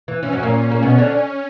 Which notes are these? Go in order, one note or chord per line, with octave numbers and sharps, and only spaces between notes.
E3
E3 C#4
F#2 F#3
A#2 A#3
A#3
B2 B3 C#4
D3 D4